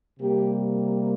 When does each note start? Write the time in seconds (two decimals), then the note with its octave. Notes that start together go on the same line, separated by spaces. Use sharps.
0.19 C3 G3 A#3 G4